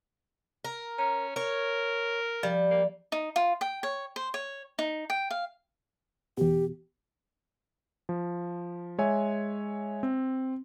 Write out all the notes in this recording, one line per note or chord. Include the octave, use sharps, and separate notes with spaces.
A#4
C#4 A#5
A#4 C#5
F3 G3
A#3
D#4
F4
G5
C#5
C5
C#5
D#4
G5
F5
E2 B2 G4
F3
G#3 C#5 E5 G#5
C4